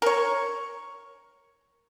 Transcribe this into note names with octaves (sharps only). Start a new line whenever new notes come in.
A#4 C#5